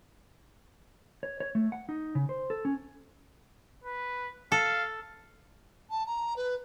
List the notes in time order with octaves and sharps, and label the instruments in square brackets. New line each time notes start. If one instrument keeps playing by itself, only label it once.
[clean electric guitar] C#5
C#5
A3
F#5
D#4
C#3
C5
A4
C#4
[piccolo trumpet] B4
[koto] A4 [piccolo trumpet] F5
[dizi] A5
A#5
B4